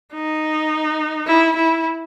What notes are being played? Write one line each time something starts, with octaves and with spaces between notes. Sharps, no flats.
D#4
E4
E4